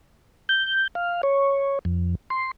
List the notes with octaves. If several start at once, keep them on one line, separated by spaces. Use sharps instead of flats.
G6
F5
C#5
F2
C6